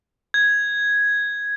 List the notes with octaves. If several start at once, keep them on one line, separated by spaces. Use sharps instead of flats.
G#6